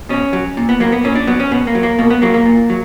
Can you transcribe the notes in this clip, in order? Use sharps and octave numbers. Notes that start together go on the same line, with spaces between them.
B2 C#4
F#3
A#2
B3
F#3 A#3
B3
A#2 C#4
D4
F#3 B3
C#4
B2 B3
A#3
F#3
A#3
B2 A#3
B3
F#3 A#3
A#3
A#2
F#3